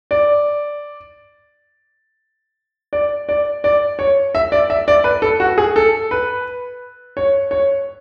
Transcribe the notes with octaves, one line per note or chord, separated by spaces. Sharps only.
D5
D5
D5
D5
C#5
E5
D5
E5
D5
B4
A4
F#4
G#4
A4
B4
C#5
C#5